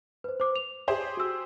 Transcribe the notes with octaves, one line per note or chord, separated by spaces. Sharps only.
B4 C5
C5 D6
F7
G4 G#4 C5
F#4 E6